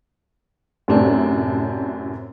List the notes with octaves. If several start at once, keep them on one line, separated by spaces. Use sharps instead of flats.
F#2 A2 C3 C4 D4